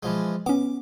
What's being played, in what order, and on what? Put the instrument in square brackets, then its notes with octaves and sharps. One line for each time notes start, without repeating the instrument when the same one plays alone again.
[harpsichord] E3 F3 G#3
[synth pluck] B3 C#4 [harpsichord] D6